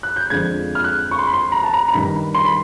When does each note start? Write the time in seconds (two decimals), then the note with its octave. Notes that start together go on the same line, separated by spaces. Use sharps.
0.03 F#6
0.16 G6
0.30 F2 D3 F3 G#3 G#6
0.75 F6
0.84 F#6
1.11 C#6
1.18 C6
1.27 B5
1.33 C6
1.52 A#5
1.63 A5
1.73 A#5
1.88 A#5
1.94 G2 D#3 G3 B5
2.34 C6
2.45 B5